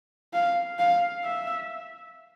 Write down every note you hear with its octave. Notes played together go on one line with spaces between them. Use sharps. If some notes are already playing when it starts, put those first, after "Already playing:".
F5
F5
E5